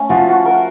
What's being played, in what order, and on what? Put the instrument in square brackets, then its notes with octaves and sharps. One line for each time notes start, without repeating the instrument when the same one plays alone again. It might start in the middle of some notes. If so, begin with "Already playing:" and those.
Already playing: [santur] A3 C#4
[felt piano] F3 F4 [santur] F#4
[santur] F#4
A#4